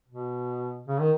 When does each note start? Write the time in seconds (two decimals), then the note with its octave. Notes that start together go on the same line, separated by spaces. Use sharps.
0.08 B2
0.88 C#3
0.99 D#3